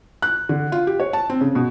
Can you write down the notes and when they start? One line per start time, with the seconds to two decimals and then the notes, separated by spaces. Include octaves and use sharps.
0.22 F#6
0.49 D3
0.72 F4
0.87 G4
1.00 C#5
1.13 A5
1.30 C4
1.41 C#3
1.55 B2